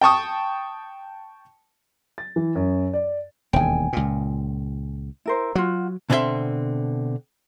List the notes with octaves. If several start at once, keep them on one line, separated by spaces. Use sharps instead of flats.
G5 A5 C#6 D#6
A6
E3
F#2
D5
E1 D#2 G5 G#5
C#2 A#2
E4 A#4 C5
F#3 F4 F#4
B2 D3 C4 D4 E5 C6